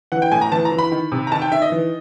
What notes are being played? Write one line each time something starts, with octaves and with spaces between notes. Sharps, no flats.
E3 F#5
G5
A2 G#5
A#5
E3 A5
A#5
E3
B5
D#3
C3
A#5
D#3 A5
G5
D#3 E5
D#5
E3